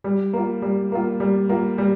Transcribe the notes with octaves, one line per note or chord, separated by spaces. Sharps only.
G3
A#3 F4
G3
A#3 F4
G3
A#3 F4
G3